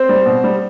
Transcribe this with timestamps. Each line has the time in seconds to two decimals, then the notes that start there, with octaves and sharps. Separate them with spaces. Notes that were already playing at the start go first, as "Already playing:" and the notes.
Already playing: C4 C5
0.09 G3
0.26 B2
0.44 G3